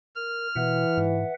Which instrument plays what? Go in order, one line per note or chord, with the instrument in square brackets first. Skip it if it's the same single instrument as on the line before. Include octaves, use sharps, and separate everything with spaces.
[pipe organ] A#4 [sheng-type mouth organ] F6
[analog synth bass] B2 [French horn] E3 [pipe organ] B4 E5 F#5
[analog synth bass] G#2